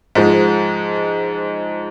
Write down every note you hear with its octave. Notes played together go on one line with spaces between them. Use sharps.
G#2 F3 G#3